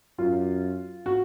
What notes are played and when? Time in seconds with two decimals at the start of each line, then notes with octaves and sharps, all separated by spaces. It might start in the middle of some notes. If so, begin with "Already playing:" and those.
0.18 F#2 F4
1.06 F#4